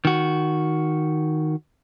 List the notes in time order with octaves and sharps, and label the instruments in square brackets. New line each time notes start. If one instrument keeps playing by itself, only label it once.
[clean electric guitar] D#3 F#4